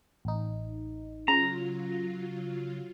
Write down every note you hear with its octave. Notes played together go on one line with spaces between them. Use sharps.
A1 D#4
C#3 F#3 F4 A#5